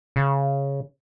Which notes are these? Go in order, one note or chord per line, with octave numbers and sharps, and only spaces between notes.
C#3